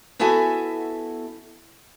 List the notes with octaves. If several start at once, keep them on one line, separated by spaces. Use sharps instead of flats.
B3 E4 F#4 A4 E5 G#5